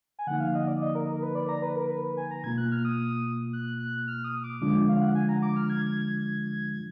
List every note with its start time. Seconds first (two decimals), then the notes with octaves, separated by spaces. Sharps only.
0.19 G#5
0.27 D3 F3 A#3 D#4 F#5
0.40 F5
0.55 D#5
0.67 D5
0.82 D#5
0.95 A#4
1.09 A#4
1.22 B4
1.35 D5
1.49 A#5
1.62 B4
1.76 A#4
1.89 B4
2.17 G#5
2.31 A#5
2.44 B2 A#3 F4 G#6
2.58 F#6
2.72 F6
2.85 D#6
3.53 F#6
3.80 F#6
4.07 F6
4.24 D#6
4.44 D6
4.61 D3 F3 G#3 D4 F4 D6
4.89 F5
5.01 F#5
5.15 G#5
5.29 A#5
5.42 D6
5.56 F6
5.70 G#6